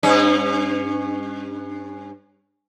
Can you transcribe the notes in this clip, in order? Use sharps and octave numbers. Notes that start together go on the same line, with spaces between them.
G2 C#4